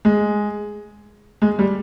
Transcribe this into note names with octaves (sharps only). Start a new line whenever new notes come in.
G#3
G#3
G3